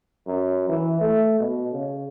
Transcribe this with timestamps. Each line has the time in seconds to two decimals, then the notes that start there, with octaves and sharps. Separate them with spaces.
0.27 F#2
0.69 E3
1.01 A3
1.40 B2
1.73 C#3